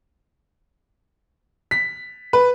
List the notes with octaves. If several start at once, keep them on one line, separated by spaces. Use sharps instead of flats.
B6
B4